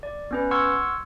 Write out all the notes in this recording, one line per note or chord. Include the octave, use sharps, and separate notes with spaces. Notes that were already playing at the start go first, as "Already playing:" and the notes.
D5
B3 C#4 B4
F#5 C6 C#6 E6 F6 G#6